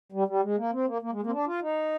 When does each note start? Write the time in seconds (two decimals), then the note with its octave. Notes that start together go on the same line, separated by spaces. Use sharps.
0.12 G3
0.28 G3
0.43 G#3
0.57 A#3
0.72 C4
0.87 A#3
1.02 A#3
1.12 G#3
1.22 A#3
1.27 C4
1.32 D4
1.46 F4
1.62 D#4